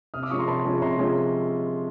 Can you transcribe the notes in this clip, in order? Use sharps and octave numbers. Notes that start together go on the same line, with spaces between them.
C3 D#6 F6
D6 E6
F3 G#3 C#4 C#6 D#6
A#5 C6
C3 A5 B5
F3 G#3 C#4
C#6
C3 A#5 C6
F3 G#3 C#4